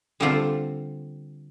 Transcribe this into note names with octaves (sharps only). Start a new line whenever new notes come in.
D3 G3 C4 F4 A4